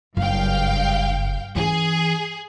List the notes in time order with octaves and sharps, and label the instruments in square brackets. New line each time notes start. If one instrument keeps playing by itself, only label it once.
[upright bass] F#1 [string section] G2 F5 G5
[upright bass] E3 C#4 [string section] G#4